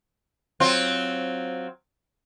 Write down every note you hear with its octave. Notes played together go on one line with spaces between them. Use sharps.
F#3 C4 F4